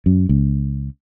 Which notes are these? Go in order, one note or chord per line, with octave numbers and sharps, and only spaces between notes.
F#2
C#2